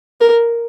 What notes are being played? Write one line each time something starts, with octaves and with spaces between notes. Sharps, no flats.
A#4